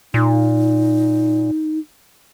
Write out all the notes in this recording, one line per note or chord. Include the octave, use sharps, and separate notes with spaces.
A#2 D#4